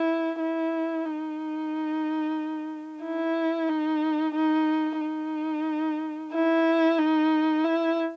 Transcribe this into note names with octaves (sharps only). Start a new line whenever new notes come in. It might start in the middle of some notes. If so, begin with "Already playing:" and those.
Already playing: E4
E4
D#4
E4
D#4
D#4
D#4
E4
D#4
E4